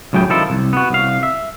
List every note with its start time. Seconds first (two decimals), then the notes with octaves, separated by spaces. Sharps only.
0.13 C#2 A2 F#3 G#4 G5
0.30 D#3 F3 E4 A4
0.50 C2
0.73 B3 F#4
0.90 C2 F5
1.23 E5